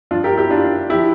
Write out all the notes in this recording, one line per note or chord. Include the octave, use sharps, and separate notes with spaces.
G2 F3 D4 F4
G4 A#4
E4 G4
D4 F4
D4
F3 E4 G4